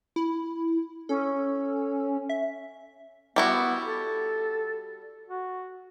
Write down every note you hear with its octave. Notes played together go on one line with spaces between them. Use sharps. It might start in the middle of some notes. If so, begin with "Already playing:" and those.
E4
C#4 A4
E5
G3 B3 E4 F#4
A4
F#4